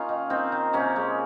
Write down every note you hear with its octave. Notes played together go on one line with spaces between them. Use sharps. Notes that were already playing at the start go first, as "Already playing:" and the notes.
Already playing: A#3 C#4 D#4 F4
D#3
A#3 C4 D#4
D#3
C3 A#3 C#4
G#3